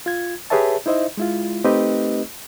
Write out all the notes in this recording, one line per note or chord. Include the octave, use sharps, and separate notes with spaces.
F4 G#6
G4 G#4 B4 C#5 E5 A5
D#4 E4 C5 D#5 E5
G#3 E4 F4
A3 C4 D#4 G4 B4 D#5